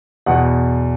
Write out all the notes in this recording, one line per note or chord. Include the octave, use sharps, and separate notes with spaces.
E2 B2 F#5